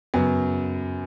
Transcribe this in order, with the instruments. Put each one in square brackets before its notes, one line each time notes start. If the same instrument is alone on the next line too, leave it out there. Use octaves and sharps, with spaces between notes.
[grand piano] F#2 C#3 F#3 B3